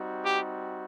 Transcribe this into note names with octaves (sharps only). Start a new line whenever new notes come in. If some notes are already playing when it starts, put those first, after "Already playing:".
Already playing: G3 C4 D#4 F#4
G4